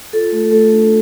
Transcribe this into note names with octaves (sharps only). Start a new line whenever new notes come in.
F4 A4
A3
A3 A4
D4